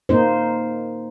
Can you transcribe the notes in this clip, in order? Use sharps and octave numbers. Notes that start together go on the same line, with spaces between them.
A#3 D#4 C5